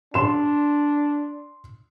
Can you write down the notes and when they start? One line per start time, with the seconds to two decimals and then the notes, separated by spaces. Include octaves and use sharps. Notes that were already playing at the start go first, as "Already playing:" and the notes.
0.14 D4 C6 E7